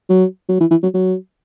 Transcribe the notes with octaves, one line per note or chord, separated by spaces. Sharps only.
F#3
F#3
E3
E3
F#3
F#3